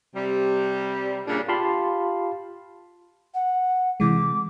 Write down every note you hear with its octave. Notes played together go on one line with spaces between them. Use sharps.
C3 G3
A#2 C#3 G3 D4
F4 G4 F5 A5 B5 C6
F#5
C3 E3 G#3 D6